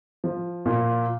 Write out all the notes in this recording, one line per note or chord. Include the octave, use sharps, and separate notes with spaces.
F3
A#2